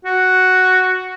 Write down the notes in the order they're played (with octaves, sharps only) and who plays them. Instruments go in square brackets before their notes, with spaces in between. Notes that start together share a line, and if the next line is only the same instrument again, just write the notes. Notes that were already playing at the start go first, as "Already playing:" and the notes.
[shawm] F#4